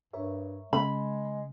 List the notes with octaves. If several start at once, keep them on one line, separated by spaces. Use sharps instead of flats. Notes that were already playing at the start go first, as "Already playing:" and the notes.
G2 A#4 C#5 E5
C#3 G#3 B5